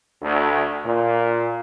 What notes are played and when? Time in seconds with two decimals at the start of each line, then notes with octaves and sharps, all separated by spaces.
0.23 D2
0.85 A#2